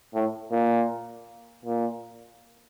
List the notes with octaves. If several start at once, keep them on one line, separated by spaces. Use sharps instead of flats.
A2
A#2
A#2